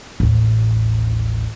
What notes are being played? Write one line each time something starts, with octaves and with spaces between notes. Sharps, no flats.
A1 D#2